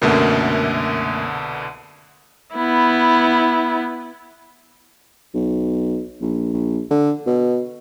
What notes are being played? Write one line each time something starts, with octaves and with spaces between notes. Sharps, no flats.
C2 F#2 B2 D3 A3 A#3
B3 E4
B1
A#1
A#1
D3
B2